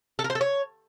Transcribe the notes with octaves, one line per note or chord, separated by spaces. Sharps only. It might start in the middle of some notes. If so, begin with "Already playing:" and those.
A4
A#4
C5
A4
C#5